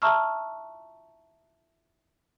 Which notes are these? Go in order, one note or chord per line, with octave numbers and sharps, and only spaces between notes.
E5 A5 A#5 C#6 E6 F6